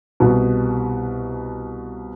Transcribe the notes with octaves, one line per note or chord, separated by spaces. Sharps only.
C2 B2